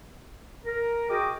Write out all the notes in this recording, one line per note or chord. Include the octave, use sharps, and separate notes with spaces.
A#4
F#4 G#4 D#5 G5 A#5 D6